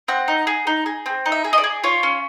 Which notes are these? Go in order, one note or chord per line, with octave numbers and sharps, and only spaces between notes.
C4 F#5
D#4
G#4
D#4
G#4
C4
D#4
E5
G#4
D#5
D5
G#4
F4 C#5
C#4